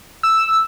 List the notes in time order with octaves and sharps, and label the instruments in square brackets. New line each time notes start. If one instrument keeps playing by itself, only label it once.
[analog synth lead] E6